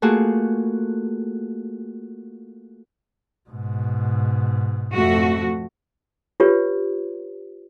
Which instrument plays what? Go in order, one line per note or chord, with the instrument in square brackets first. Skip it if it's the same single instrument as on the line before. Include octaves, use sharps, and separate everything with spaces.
[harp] A3 A#3 F4 F#4 G#4
[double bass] G#2 B2
[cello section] F2 A3 F#4
[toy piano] F4 G4 B4 C#5